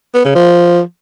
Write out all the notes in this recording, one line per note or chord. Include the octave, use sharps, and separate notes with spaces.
B3
C#3
F3